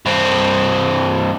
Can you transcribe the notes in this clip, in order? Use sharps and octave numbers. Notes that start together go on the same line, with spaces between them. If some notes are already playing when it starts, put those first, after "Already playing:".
G2 C4